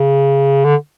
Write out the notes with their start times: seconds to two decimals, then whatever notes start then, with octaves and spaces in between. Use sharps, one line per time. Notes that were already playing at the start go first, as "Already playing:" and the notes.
Already playing: C#3
0.64 D3